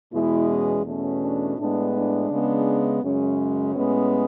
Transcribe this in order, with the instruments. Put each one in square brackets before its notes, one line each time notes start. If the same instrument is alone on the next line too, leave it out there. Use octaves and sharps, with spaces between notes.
[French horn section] E2 B2 G#3 E4
C#4
E2 B2 A3 C#4
D4
A2 G#3 B3 D4
D4
C#3 G#3 B3
F#2 C#3 G#3 C#4
A2 G#3 B3